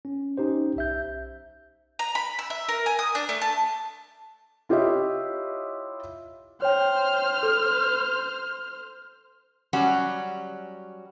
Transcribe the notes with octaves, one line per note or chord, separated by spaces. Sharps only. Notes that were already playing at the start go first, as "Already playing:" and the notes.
C#4
C#4 D#4 G4 C5
B1 E5 G6
A#5
B5
E6
E5
A#4
G#5
D#6
D4
A3
A5
E4 F4 G4 C#5 D#5 E5
C5 C#5 G5 F6
A4
F#3 G3 C#4 F#4